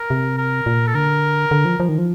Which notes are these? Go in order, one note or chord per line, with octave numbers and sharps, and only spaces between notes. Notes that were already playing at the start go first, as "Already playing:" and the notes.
Already playing: A#4
C3
A#4
A#2
A4
D3 A#4
D3
F3
F3
D#3
F3